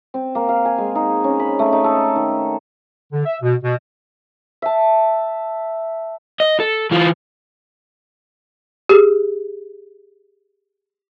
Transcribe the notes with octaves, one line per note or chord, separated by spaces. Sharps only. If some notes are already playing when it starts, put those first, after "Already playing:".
C4
A#3
F5
G#5
G#3
D#4
C#4
B5
A3
D#4
A4
D#3
D3
E5
B2
B2
E5 A5
D#5
A4
E3 F4
G4 G#4